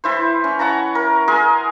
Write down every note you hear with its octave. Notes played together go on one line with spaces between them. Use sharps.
E3 E4 C5
C#4
C#5 F#5 A5 A#5
A#4
G#4 A#4 G#5 C6